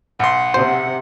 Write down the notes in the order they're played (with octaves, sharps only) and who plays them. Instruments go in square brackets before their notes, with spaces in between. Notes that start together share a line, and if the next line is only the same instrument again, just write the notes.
[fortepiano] B1 C6 [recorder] F#5
[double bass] C3 [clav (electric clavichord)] C5